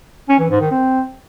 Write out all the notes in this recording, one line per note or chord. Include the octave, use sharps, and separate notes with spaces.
C#4
E3
G#2
D#3
C4